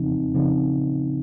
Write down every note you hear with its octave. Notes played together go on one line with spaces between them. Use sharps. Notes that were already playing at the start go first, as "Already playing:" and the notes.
Already playing: C#3 F3 C4 D#4
C#3 F3 C4 D#4